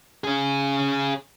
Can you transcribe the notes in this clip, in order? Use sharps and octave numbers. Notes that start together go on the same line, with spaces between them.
C#4 G#4